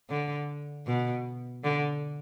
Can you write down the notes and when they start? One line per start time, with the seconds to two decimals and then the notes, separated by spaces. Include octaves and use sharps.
0.10 D3
0.87 B2
1.64 D3